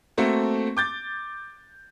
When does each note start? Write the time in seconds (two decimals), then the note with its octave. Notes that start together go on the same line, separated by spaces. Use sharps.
0.18 A3 A#3 C4 F#4
0.77 D6 G6 A6